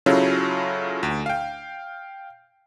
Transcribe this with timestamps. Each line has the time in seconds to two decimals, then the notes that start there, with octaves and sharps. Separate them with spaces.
0.06 C#3 F#3 C#4 E4 F4 A4
1.03 D2
1.26 F5 G5